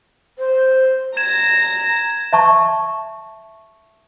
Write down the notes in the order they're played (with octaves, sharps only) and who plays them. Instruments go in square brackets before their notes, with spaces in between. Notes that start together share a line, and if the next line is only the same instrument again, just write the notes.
[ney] C5
[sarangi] A#5 [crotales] G#6 E7
[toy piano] E5 A5 C#6